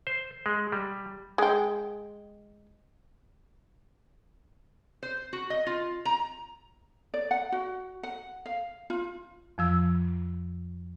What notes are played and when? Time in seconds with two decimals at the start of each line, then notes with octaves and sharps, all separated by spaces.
0.07 C5
0.46 G#3
0.72 G3
1.38 G#3 G5
5.03 C5
5.33 F#4
5.50 D#5
5.67 F4
6.05 A#5
7.14 D5
7.31 F#5
7.52 F#4
8.03 F#5
8.46 F5
8.90 F4
9.58 F2 F3 E6